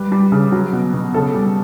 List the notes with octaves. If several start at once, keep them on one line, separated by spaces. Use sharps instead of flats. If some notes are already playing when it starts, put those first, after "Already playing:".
Already playing: G3 B4
G3
C#3
F#3
B2
B2
C#3 A4
G3